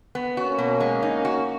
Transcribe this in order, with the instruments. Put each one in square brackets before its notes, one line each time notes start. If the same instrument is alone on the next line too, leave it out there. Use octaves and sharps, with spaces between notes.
[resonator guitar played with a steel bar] B3
[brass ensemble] A#3 C#4 [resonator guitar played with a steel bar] F#4
[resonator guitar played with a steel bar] B2
G#3
D#4
F#4